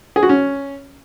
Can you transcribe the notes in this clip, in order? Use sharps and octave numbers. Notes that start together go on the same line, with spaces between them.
G#4
F#4
C#4